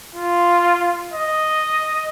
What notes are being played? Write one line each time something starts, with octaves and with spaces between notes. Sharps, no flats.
F4
D#5